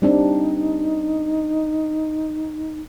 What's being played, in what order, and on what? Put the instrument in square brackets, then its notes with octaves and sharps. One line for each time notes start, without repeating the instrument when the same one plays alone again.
[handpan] G3 C4 D4 [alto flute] D#4